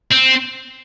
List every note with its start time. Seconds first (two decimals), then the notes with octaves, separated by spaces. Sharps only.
0.11 C4